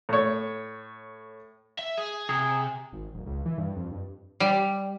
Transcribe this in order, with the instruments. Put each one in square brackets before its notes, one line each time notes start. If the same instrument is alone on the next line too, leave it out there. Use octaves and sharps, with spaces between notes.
[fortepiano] A2 C#5
[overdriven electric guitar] E5
G#4
[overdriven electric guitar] C3 [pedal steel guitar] G#4
[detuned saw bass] G#1
D1
C#2
E3
G2
F2
G2
[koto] G3